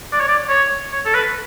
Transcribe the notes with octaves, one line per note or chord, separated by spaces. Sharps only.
D5
C#5
D5
C#5
C#5
A4
B4